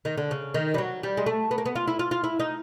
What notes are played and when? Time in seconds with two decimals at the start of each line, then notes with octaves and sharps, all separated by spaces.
0.05 D#3
0.17 D3
0.31 C#3
0.54 D#3
0.74 G3
0.78 F#3
1.03 G3
1.17 G#3
1.26 A3
1.51 B3
1.58 A#3
1.66 B3
1.75 F4
1.88 E4
1.99 F4
2.11 F4
2.24 E4
2.40 D#4